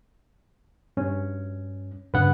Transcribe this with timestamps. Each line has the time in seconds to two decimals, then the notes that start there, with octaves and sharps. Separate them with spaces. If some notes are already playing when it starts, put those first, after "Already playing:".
0.97 G2 C#4
2.14 G2 C#3 B4 F#5